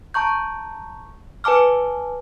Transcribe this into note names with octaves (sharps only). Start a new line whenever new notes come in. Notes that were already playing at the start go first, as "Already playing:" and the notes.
A5 A#5 C#6 G6
B4 G#5 A5 D6 F6